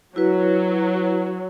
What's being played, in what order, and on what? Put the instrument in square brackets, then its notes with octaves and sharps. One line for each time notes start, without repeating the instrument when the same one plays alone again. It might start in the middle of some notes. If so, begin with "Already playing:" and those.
[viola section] F#3 [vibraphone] E4 F#4 B4